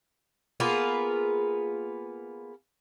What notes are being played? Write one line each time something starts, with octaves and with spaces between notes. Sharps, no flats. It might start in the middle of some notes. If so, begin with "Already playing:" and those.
A#3 B3 F4 G#4